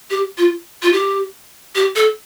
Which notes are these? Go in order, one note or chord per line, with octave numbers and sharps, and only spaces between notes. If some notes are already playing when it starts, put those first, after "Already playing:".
G4
F4
F4
G4
G4
A4